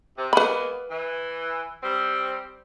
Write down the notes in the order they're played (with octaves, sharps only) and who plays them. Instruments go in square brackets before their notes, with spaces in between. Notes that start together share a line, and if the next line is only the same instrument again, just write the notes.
[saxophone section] C3
[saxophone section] G#3 A#3 B3 [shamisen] B4 B5
[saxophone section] E3
G3 C4